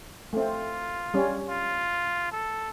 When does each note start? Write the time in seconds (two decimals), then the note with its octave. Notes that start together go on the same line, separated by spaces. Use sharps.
0.33 A3 C4 F4
1.14 G3 C#4
1.49 F4
2.32 A4